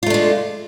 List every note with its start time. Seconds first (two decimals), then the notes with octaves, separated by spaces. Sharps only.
0.03 F4
0.06 A3
0.10 D4
0.14 G#3